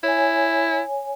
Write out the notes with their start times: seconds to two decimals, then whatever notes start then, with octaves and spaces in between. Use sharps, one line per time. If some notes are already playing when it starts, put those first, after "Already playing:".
0.04 E4 C#5 G#5